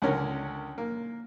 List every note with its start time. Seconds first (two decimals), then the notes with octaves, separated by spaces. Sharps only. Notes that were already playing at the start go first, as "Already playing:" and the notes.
0.02 C#2 D3 C#4 A#4
0.78 A#3